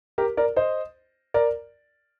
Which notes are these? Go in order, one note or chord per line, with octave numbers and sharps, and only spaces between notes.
G4 A#4
A#4 D5
C5 D#5
A#4 D5